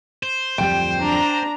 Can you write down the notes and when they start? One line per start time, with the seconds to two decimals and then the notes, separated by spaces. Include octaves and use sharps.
0.23 C5
0.58 D1 F2 G3 G5
0.98 D4 A#5